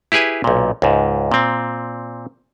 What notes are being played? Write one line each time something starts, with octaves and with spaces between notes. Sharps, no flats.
E4 G4 G#4 B4 G#5
B1 A#2
C#2 G#2
A#2 C4